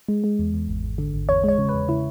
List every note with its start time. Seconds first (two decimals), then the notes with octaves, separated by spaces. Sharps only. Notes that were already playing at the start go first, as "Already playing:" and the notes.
0.08 G#3
0.24 G#3
0.39 E2
0.54 E2
0.68 G#1
0.83 G#1
0.98 D3
1.14 G#1
1.29 E2 C#5
1.44 G#3 C#5
1.58 C#3
1.69 B4
1.74 E2
1.89 C#3 E4